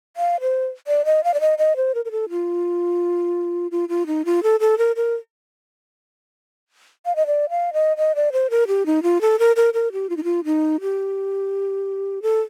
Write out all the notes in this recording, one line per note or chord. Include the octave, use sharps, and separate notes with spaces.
F5
C5
D5
D#5
F5
D5
D#5
D#5
C5
A#4
A#4
A4
F4
F4
F4
D#4
F4
A4
A4
A#4
A#4
F5
D#5
D5
F5
D#5
D#5
D5
C5
A#4
G4
D#4
F4
A4
A#4
A#4
A#4
G4
F4
D#4
F4
D#4
G4
A4